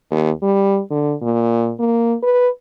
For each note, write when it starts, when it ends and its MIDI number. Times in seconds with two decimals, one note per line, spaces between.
0.11 0.31 39
0.43 0.80 55
0.91 1.14 50
1.22 1.73 46
1.79 2.15 58
2.23 2.49 71